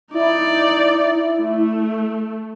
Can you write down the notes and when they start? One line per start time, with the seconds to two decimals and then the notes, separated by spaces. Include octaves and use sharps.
0.14 D#4 E4 D5
1.41 A3